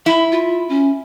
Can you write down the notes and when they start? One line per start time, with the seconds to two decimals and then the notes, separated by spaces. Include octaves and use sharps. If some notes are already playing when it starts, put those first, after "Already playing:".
0.06 E4 B5
0.31 F4
0.69 C#4